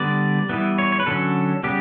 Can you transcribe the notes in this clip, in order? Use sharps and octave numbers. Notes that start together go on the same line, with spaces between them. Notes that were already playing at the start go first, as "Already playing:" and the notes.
Already playing: D3 G3 B3 D5
E3 G3 B3
C#5
C#5
B4
D3 F#3 C#4 A4
C#3 G3 B3 G4